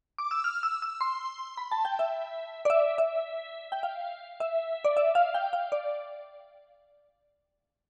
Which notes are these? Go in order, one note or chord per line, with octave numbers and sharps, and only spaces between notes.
D6
E6
F6
E6
E6
C6
B5
A5
G5
E5
D5
E5
E5
G5
F5
E5
D5
E5
F5
G5
F5
D5